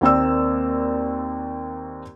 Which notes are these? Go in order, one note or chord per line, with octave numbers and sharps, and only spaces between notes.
D#2 A#3 C4 D5 E6